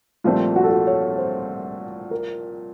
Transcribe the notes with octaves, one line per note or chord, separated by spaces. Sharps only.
C2 A#2 F3 A3 C4 F4
F#4
A4
F#4
C#5
C5
A#4